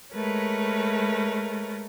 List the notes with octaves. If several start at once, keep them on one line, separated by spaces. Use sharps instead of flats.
G#3 A3 A#4 B4 C#5